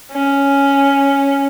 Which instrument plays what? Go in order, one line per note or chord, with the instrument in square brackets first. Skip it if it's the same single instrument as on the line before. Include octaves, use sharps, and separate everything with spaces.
[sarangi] C#4